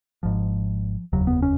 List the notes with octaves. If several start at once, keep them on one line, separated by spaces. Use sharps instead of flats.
G#1 G#2 F3
F1 D#2 C#3 F#3
B3
C#4